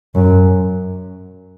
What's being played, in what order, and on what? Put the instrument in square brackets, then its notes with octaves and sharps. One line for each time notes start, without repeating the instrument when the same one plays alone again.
[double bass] F#2